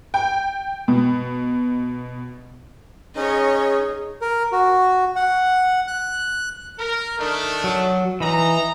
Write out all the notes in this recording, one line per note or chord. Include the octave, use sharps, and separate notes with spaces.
G5
B2
C#4 D#4 G#4 C#5 D#5
A#4
F#4
F#5
F#6
A#4
D#3 A3 D4
F#3
E3 D#4 A#5